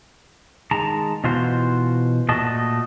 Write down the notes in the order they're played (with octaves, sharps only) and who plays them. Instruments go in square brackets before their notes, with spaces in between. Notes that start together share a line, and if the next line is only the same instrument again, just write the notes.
[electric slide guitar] D#3 G#3 A5 A#5
B2 E3 F4 F#4 C5
A#2 A3 F#4 D#5 A5